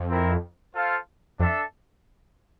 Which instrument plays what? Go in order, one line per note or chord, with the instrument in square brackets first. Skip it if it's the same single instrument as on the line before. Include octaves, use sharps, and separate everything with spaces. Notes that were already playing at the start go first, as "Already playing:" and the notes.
Already playing: [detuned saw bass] F2
[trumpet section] C4 E4 A#4
F4 A4 C5 F5
[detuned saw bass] F2 [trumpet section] D4 A4 E5